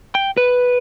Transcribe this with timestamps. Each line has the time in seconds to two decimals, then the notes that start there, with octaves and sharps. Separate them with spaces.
0.15 G5
0.37 B4